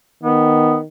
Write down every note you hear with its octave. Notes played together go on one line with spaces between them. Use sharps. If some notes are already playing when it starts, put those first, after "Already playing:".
D#3 B3